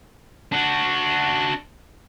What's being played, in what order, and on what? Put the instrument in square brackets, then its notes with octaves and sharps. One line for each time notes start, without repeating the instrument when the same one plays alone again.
[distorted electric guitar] D4 F#4